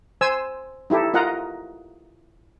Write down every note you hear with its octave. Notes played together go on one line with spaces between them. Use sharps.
C5 G#5 E6
D#4 E4 G4 A4
F4 A#4 D#5 F#5 A#5